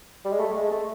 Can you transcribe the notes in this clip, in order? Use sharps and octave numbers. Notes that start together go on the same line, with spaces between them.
G3
G#3
A3
G#3
A3